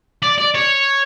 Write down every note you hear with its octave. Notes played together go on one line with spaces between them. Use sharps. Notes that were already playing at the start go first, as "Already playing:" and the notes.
D5
D5
C#5